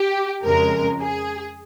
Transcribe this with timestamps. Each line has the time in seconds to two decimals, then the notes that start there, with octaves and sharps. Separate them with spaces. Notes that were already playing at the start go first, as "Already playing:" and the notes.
Already playing: G4
0.44 F2 C#3 G#3 A#4
1.01 G#4